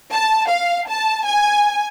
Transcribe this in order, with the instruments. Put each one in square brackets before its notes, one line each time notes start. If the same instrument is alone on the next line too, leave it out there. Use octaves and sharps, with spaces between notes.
[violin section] A5
F5
A5
G#5